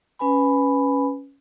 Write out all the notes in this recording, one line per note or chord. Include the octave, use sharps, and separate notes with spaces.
C#4 B4 G#5 B5